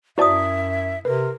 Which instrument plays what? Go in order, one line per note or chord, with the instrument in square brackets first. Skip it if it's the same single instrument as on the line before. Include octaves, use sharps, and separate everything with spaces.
[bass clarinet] F#2 [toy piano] E4 A5 D#6 [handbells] F#4 C5 D5 [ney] E5
[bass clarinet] C3 [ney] A#4 [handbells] B4